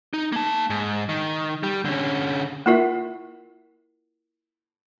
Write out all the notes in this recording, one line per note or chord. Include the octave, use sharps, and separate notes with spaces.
D#4
A#3 A5
G#2
D#3
G3
D3 C#4
A#3 E4 F4 A#4 E5